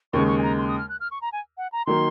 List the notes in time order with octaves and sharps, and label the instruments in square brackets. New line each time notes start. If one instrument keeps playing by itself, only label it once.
[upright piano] D#2 C#3 G#3 [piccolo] C#6
[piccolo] C#6
G#5
A#5
C6
D#6
F6
F#6
F6
C#6
A#5
G#5
F#5
A#5
[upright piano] D#3 F#3 A#3 D#4 [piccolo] C6